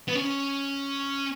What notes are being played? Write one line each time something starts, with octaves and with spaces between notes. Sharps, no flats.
B3
C#4